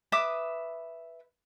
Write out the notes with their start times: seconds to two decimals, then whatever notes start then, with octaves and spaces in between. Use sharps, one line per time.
0.12 B4 E5 D6 D#6